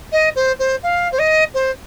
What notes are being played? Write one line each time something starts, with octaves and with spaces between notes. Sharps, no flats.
D#5
C5
C5
F5
C5
D#5
C5